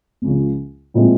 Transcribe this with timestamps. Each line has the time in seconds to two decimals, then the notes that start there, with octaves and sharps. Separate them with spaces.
0.22 C#2 C#3 F3
0.94 A#2 F3 G#3 C4 E4